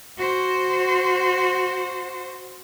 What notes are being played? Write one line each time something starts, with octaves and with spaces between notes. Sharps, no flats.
F#4 C5